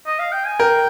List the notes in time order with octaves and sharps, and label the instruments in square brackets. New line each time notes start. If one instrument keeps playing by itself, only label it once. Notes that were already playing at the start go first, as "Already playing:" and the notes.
[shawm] D#5
F5
G5
G#5
[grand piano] A#4 [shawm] G5